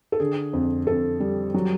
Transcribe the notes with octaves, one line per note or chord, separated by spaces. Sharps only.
A4
D3 G#4
F2
F2 A4
G3
F#3